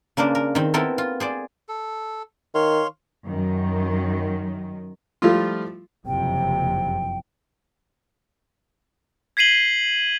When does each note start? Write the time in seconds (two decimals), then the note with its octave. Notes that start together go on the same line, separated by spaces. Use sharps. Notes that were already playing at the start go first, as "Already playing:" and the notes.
0.17 C#3 A#3 D4 A#4 C5
0.35 A#4
0.55 D#3 C4
0.74 B3 C4 E4 A4 A#4
0.98 F4
1.20 G#4 C5 D5
1.69 A4
2.55 D#3 C#5 F5 C6
3.27 F#2 D#3
5.22 F3 G3 A3 E4 F4
6.06 F#1 F2 C3 G5
9.37 G#6 B6 C7 D#7 F#7 G7